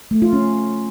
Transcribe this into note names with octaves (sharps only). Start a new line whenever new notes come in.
A3
F4
C#4